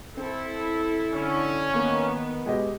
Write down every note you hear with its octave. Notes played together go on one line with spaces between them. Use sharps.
C4 E4 A4
D3 C#4
D#3 A#3 B3
B2 G#3 G4 D#5